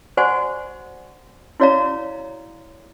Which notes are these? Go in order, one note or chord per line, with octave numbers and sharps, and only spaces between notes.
F#4 C5 D5 F#5 G#5 C#6
E4 F#4 C#5 D5 F5 A#5